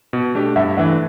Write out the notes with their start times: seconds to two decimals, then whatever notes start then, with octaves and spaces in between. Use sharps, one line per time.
0.13 B2
0.35 A3 D4 G4
0.56 G2 E5
0.77 E3 A3 D4 E5